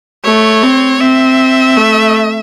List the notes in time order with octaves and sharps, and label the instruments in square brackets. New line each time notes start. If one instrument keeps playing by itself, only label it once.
[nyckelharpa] A3 [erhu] C#5
[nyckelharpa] C4
[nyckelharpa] C4 [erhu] E5
[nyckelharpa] A3